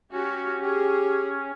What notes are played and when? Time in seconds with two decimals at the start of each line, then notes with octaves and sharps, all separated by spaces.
0.12 C#4 F#4 G4
0.62 G4 G#4